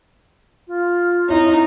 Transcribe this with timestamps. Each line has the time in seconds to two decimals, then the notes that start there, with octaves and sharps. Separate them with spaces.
0.67 F4
1.29 D#4 E4 C#5